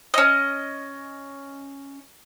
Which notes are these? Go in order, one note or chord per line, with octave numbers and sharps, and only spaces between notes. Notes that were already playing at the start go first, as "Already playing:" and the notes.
C#4 D#5